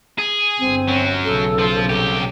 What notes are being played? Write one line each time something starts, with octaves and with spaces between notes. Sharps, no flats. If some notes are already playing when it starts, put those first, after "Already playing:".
G#4
G1 C4
F#3 C#4
B1 C#3 A4
F3 F4
C2 G4 A4